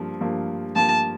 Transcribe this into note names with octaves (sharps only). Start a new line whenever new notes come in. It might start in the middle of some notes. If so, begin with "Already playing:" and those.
Already playing: G2 F3 A#3
G2 F3 A#3
G2 F3 A#3 A5